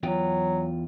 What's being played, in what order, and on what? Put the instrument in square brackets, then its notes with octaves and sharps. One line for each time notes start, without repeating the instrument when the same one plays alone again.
[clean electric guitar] E2 F4 G5 [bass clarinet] F#3